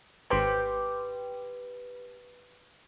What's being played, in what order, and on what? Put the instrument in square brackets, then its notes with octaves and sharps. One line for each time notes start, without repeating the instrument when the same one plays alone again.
[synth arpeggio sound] G#1 C5 [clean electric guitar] G4 G5 C6 [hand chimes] B4